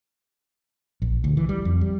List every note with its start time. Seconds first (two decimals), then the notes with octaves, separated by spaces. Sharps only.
1.02 A#1
1.24 D2
1.37 E3
1.49 G3
1.65 F2
1.81 G3